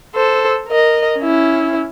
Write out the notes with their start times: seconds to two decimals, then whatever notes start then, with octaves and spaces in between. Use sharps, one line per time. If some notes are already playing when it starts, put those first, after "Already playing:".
0.15 A4 C5
0.67 A#4 D#5
1.19 C#4 E4